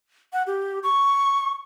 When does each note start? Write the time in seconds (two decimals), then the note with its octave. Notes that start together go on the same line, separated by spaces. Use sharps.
0.33 F#5
0.47 G4
0.83 C#6